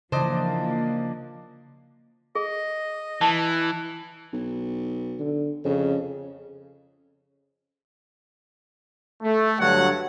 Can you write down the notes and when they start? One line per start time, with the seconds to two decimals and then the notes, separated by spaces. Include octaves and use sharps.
0.12 C#3 E3 F3 A#3 D4 C5 D5 D#5
2.35 G#4 D#5
3.21 E3 A5
4.33 B1
5.19 D3
5.64 F2 C#3
9.22 A3
9.59 G2 D3 F#3 F#4 C#5 F#5